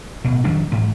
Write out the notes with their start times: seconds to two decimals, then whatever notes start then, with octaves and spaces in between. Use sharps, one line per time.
0.24 D1 B2
0.44 F2 D#3 F#3 D4
0.72 A1 G#2